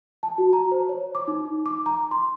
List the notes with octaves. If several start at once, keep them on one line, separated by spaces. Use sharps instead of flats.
A5
F#4
A#5
C5
C#5
D6
D#4
D6
A#5
C6